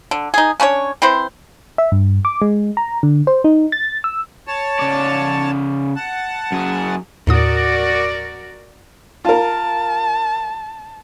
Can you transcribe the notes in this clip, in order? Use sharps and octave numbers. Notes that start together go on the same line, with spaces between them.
D3
D#4 G#4
C#4 D4 B4 C#5
C4 E4 B4 C5
E5
G2
D6
G#3
A#5
D3
C5
D#4
A6
E6
C#5 A5
C#3 D5
F#5 A5
F#2 G#4
D#2 A2 F#4 A#4 D5 D#6
F4 A#4 A5